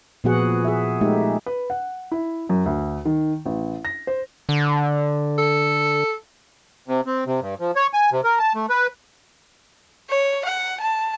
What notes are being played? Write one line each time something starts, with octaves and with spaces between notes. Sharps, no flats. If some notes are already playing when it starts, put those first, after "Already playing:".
A#2 F3 B3 F#4 G#4 F#5
G#4 E5
G#3 A3 D#4 G4 E5
B4
F#5
E4
F#2
D2
D#3
A1
A#6
C5
D3
A4
C3
C4
C3
G2
F3
C#5
G#5
C3
A#4
A5
A3
B4
C#5
F#5
A5